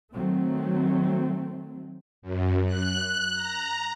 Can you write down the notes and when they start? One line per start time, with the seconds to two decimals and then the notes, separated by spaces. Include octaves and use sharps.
0.13 D#3 F#3 A3 C4
2.22 F#2
2.66 F#6
3.34 A#5